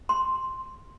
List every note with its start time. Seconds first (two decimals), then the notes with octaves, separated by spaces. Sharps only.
0.09 C6